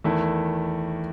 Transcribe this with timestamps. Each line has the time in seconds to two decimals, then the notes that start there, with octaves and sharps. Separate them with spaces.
0.04 E2 D#3 A3 E4